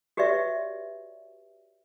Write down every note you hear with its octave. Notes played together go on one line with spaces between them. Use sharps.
F#4 G4 B4 C#5 D5 E5